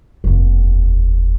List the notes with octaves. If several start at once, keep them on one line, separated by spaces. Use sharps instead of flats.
F1 D#2